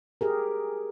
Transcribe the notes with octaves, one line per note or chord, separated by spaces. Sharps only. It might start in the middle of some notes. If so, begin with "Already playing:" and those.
G4 G#4 A#4